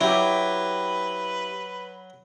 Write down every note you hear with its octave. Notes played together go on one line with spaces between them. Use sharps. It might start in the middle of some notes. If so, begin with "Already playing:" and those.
F#3 E4 G4 B4